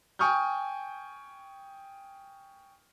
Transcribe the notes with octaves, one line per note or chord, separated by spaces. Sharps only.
G5 G#5 C#6 D#6 F6 G6